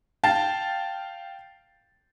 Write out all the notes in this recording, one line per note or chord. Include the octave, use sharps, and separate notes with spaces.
F5 G5 A5 A6